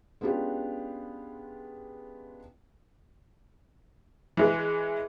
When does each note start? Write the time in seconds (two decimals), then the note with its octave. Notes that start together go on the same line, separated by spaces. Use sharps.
0.21 G#3 B3 C#4 D4 F4 G4
4.37 E3 G#3